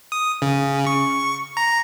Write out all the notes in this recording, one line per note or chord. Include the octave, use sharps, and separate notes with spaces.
D#6
C#3
C#6
A#5